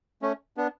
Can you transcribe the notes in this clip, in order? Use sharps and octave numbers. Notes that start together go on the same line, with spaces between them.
A3 C#4
B3 D4